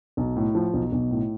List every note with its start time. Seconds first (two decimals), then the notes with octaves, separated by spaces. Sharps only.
0.17 B1
0.37 A2
0.55 F3
0.74 B1
0.92 B1
1.11 A2